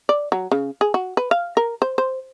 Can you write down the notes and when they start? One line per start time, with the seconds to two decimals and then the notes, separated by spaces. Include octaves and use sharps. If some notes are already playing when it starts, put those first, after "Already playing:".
0.09 D5
0.32 F#3
0.52 C#3
0.81 G#4
0.94 F#4
1.17 B4
1.31 F5
1.57 A#4
1.82 C5
1.98 C5